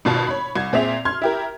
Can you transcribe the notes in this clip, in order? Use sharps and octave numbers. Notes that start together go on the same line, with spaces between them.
G#1 B2 F4 A5
C#5 B5
C2 G#6
A#2 C4 G#4 E5 F7
C6 F6 G#6
E4 G4 A#4